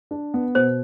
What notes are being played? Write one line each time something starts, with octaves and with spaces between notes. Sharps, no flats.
D4
B3
B2 C5